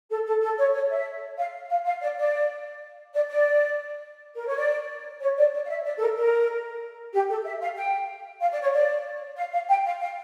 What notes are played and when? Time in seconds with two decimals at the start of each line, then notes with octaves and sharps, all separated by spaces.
0.10 A4
0.26 A4
0.42 A4
0.58 C#5
0.73 C#5
0.90 E5
1.38 F5
1.70 F5
1.85 F5
2.01 D5
2.18 D5
3.14 D5
3.29 D5
4.35 A#4
4.47 C#5
4.57 D5
5.21 C#5
5.37 D5
5.53 D5
5.65 F5
5.69 E5
5.85 D5
5.98 A4
6.00 A#4
6.17 A#4
7.13 G4
7.29 A4
7.45 E5
7.61 F5
7.76 G5
8.41 F5
8.52 D5
8.62 C#5
8.73 D5
9.37 F5
9.52 F5
9.69 G5
9.85 F5
10.00 F5